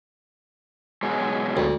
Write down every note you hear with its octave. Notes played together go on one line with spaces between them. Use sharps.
B2 F#3 G#3
D2